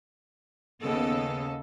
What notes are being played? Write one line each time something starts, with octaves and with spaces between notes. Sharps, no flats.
D#2 C#3 A#3 B3 A4 D#5